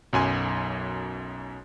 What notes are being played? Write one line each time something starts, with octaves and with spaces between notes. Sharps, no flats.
B1 F#2 G#5 C6